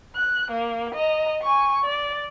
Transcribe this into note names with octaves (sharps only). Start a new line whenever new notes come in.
F#6
A#3
D#5 A#5
G#5 C#6
D5